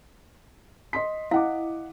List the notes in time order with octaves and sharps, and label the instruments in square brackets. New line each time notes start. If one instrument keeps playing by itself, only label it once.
[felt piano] D#5 C6 B6
[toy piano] E4 F5 [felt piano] D#5 F#5 D6